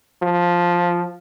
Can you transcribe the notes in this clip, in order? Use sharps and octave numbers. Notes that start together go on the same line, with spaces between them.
F3